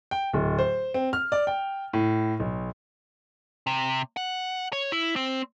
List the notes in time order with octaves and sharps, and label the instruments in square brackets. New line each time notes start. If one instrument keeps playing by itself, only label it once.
[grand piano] G5
D1
C5
C4
F6
D5
G5
A2
B1
[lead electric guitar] C3
F#5
C#5
E4
C4